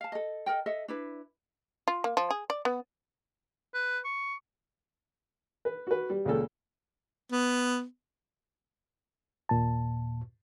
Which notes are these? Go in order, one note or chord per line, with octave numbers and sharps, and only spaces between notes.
F5 A5
A4 D#5
A4 A#4 D#5 G5
A4 D#5 E5 F#5
D4 E4 B4
F4
A#3
F3
G#4
D5
B3
B4
C#6
B4
F#4 B4
G3
C#2 A#2 C#3 A4
B3
D#2 A#2 A5